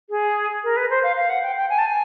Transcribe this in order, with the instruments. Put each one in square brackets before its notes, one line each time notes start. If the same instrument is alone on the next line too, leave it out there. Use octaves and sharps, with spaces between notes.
[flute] G#4
A#4
B4
C5
F5
F5
F#5
G5
G5
G#5
A5
G#5